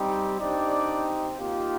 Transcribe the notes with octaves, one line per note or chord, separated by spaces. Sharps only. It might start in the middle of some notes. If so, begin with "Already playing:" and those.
Already playing: G3 C4 D#4 G4
C4 D4 D#4 G4 D5
A#3 D#4 F4 G4 F5